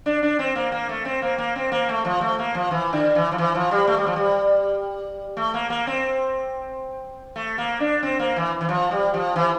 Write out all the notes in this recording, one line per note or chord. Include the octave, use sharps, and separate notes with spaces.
D4
D4
C4
A#3
A#3
A3
C4
A#3
A#3
C4
A#3
A3
F3
A3
A#3
F3
E3
D3
E3
F3
E3
F3
G3
A3
G3
F3
G3
A3
A#3
A#3
C4
A3
A#3
D4
C4
A#3
E3
E3
F3
G3
F3
E3